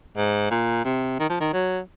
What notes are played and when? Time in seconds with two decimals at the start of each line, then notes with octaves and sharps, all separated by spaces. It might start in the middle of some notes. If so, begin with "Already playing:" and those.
0.17 G#2
0.51 A#2
0.85 C3
1.19 D#3
1.30 F3
1.40 D#3
1.53 F#3